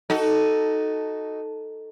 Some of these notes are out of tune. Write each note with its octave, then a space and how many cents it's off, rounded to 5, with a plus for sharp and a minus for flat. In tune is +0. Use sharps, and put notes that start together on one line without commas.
D#4 +0 F#4 +25 A4 +0